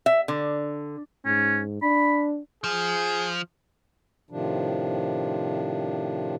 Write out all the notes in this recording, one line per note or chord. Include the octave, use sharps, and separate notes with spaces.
E5
D3
G#2 C#4
D4 B5
F3 G#4
A2 C3 D#3 F3 D4